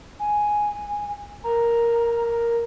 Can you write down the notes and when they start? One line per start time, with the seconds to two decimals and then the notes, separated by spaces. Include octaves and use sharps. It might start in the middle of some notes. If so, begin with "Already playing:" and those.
0.20 G#5
1.44 A#4 A#5